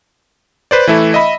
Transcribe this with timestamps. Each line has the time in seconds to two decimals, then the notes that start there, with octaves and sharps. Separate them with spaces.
0.71 B4 C5 D5
0.87 E3 A3 E4 A4
1.14 D#5 E5 B5